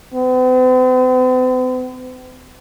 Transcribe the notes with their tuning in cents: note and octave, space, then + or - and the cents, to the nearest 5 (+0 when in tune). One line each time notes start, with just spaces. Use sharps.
C4 -45